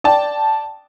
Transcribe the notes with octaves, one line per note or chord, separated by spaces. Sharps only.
D5 G5 A5